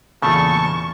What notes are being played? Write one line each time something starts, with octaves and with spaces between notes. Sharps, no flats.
E2 A#2 C#3 A3 A5 C#6